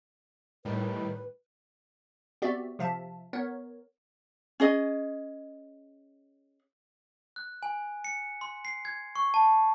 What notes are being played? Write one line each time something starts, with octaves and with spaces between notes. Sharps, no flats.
A2 D#3 G3 B4
B3 C4 F#4 G4 D5 E5
C3 F3 E5 F5 A5
B3 A#4 C#5
C#4 G#4 D#5
F#6
G#5
C#7
C6
C7
G#6
C#6
A5